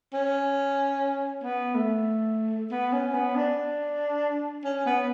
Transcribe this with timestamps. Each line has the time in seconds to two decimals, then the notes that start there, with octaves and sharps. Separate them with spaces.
0.13 C#4
1.43 B3
1.75 A3
2.71 B3
2.93 C#4
3.14 B3
3.36 D4
4.64 C#4
4.86 B3